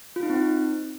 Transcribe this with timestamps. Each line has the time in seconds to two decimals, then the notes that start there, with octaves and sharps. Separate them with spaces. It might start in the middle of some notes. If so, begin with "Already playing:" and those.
0.16 F4
0.23 D#4
0.30 C4
0.36 D#4